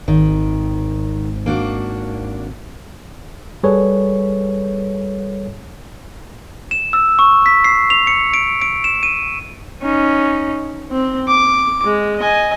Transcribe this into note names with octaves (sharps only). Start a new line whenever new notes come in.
G#1 D#3
A#3 D4 F#4
G3 G#4 A4 B4 C#5
E7
E6
C#6
B6
C7
F7
C#7
D7
D7
E7
D#7
C#4 D#4
C4
D6
G#3
D#5 G#5